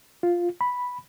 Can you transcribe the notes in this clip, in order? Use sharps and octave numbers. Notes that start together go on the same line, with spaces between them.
F4
B5